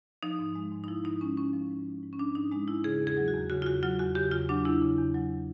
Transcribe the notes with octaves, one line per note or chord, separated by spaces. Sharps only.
F3 D#4
G#2
G#3
G#2
D#4
F3 E4
G#2 D#4
G#3 C#4
G#2 C#4
F3
G#2
G#3
G#2
C#4
F3 D4
G#2 D#4
G#3 D#4
G#2 E4
C#3 G#4
E2
G#4
F#3
F#4
E2
C#3 F#4
F4
E2 F#4
F#3 F4
E2 F#4
C#3 G4
E2 F4
F#3 D4
E2 E4
C#3
E2
F#3